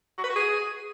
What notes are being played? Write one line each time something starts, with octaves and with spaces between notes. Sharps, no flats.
F#4
B4
F#4
G#4